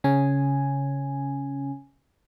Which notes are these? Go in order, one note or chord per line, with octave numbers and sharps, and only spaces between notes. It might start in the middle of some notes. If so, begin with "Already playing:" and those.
C#3 C#4 G#5